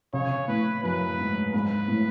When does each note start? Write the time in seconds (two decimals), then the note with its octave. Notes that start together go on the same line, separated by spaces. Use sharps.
0.13 C#3 C#5
0.48 A2 B4
0.83 F#2 B4
1.19 G#2
1.53 G#2 B4
1.88 A2